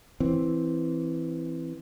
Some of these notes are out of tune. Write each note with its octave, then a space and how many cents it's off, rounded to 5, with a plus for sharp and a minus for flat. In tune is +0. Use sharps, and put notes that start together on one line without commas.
E3 +0 C4 +0